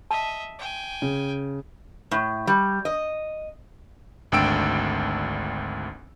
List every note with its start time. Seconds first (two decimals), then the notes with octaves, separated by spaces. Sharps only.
0.11 D#5 E5 A5
0.59 G5 G#5
1.02 C#3
2.11 A2
2.47 G3
2.85 D#5
4.32 G#1 D2 D4 G5 E6 D7